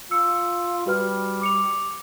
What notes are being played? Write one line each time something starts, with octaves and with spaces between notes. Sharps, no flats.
F4 E6 C#7
G3 F#4 B4 F6
D6 C#7 F7